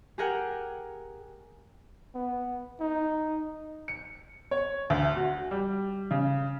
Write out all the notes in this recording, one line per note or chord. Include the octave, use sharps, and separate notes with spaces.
G4 G#4 A#4 F#5 G5
B3
D#4
C#7
C#5
D2
F#4
G3
C#3